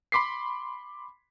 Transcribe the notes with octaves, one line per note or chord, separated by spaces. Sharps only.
B5 C6 D6 B6 C7